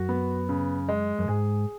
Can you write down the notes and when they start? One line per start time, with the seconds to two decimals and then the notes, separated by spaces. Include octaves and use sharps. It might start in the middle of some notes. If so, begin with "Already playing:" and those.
Already playing: F#2 F#4
0.09 B3
0.49 C#3
0.89 G#3
1.19 F#2
1.28 G#2 G#4